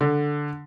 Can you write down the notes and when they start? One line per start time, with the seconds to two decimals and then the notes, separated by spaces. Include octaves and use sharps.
0.01 D3